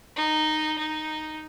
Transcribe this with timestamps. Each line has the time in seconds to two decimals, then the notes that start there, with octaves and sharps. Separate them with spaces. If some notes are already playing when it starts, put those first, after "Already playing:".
0.16 D#4
0.79 D#4